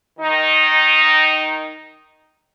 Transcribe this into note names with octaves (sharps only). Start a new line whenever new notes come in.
D#3 D#4